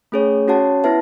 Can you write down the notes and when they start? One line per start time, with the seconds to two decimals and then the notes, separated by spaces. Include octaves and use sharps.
0.12 A3 C#4 G#4 C#5
0.48 C#4 F#4 C#5 F#5 A5
0.84 B3 E4 B4 E5 A5